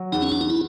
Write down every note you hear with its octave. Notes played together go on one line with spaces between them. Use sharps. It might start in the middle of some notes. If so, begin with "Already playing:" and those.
Already playing: F#3
E2 D#4
C#4
D4
D#4
E4